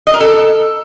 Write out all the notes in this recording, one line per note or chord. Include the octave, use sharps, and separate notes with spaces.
D#5
A#4
A4